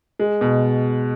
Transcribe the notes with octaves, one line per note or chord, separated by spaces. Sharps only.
G#3
B2